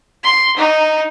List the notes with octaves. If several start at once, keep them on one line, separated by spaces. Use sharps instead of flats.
C6
D#4